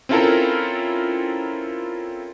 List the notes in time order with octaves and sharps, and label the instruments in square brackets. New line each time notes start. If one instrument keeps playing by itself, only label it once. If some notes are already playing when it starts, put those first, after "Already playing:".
[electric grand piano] C4 C#4 E4 F4 A4 A#4